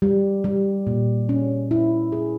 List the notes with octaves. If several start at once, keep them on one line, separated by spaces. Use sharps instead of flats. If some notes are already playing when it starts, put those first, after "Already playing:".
G3
G3
A#2
C#4
E4
G#4